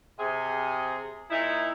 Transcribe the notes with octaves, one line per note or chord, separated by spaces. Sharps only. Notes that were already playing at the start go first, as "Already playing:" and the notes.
C3 G#4
A#2 D#4 E4